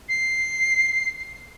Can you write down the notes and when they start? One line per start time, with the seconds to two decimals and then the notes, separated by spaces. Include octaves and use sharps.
0.08 C7